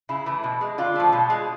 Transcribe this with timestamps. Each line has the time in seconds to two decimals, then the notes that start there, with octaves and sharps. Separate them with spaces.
0.09 C#3 E4
0.26 E3 A3
0.44 B2
0.61 G#3
0.78 D3 F4
0.96 F3 A3
1.12 B2
1.30 G#3